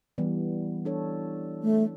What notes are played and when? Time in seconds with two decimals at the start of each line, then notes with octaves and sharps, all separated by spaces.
0.18 E3 G3 B3
0.85 D4 A4 C#5
1.63 A3